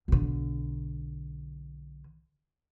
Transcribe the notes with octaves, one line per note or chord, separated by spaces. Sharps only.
B1 D3